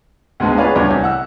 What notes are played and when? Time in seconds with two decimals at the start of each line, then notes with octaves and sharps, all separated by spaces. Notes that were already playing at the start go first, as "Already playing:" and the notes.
0.40 D2 G#2 G#3 B3 A5
0.57 F4 G#4 B4 C#5 D5 F5
0.76 D2 F#3 G3 B3 C#5 D6
0.91 C2
1.04 F#5 E6